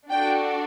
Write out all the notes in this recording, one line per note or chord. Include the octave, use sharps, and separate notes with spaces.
D4 F#4 A4 G5